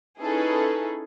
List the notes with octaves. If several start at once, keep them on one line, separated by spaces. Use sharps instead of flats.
C#4 D#4 E4 G#4 A4 B4